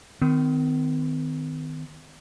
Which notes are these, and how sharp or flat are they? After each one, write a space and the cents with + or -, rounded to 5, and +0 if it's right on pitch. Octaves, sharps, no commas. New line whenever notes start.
D#3 +0 C4 -45